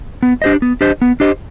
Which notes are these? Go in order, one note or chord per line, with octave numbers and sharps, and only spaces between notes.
B3
D4 G4 C5 D#5
B3
D4 G4 C5 D#5
B3
D4 G4 C5 D#5